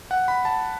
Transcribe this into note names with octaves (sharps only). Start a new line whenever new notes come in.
F#5
B5
A5